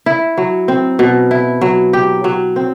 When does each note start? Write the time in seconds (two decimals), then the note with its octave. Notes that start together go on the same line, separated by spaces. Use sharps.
0.06 E4
0.38 F#3
0.68 C4
0.99 B2
1.31 E4
1.61 F#3
1.93 G4
2.24 F#3
2.56 C4